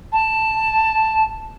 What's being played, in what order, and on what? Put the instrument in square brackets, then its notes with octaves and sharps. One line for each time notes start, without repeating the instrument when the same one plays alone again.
[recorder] A5